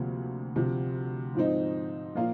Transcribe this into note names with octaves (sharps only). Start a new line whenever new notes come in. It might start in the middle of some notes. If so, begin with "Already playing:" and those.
Already playing: D2 C3 F3 A#3
D2 C3 F3
G#2 F3 C4 D#4
A#2 F3 A#3 F4